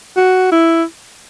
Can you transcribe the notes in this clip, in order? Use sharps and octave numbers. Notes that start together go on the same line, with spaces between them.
F#4
E4